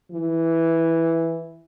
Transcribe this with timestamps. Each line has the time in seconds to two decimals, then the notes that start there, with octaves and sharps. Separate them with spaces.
0.12 E3